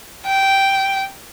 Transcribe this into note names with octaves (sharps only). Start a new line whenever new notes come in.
G5